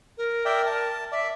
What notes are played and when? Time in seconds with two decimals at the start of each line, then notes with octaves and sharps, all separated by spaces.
0.18 A#4
0.45 D5 E5 G5
0.66 A5
1.12 D5 E5